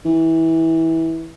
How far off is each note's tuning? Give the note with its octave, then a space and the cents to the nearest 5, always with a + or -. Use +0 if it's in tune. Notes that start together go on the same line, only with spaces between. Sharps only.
E3 -20